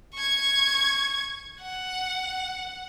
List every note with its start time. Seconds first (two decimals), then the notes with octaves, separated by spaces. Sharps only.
0.15 C#6 G#6
1.61 F#5